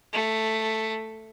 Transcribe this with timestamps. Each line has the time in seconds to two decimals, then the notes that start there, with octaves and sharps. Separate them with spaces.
0.13 A3